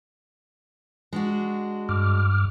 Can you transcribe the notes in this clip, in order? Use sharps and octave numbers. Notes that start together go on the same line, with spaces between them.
G#3 D4 F#4
G2 D6 F6